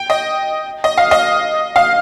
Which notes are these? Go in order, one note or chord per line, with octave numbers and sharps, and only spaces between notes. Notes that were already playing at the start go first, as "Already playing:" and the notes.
Already playing: G5
D#5
D#5
F5
D#5
F5